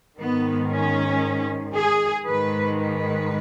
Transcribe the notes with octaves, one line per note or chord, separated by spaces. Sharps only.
G#2 D#3 B3
C#4
G#4
G#2 D#3 B4
B4